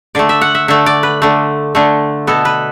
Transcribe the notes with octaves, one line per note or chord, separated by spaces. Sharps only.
D3 A3 D5
E5
F#5
E5
D3 A3 E5
D5
B4
D3 A3
D3 A3
B2 B3 A4
B4